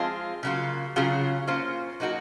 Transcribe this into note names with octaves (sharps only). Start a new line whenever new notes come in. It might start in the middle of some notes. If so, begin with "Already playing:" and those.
Already playing: F3 G#3 C4 F4 G#4
C#3 F#3 A#3 F4
C#3 F#3 C#4 F4 G#4
A#3 C#4 F4 C5
F#3 A#3 D#4 F#4 A#4